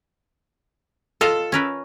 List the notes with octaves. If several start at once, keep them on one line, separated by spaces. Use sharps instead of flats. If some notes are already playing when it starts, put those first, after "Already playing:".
F4 A4 D#5 F5
C#4 A#4 B4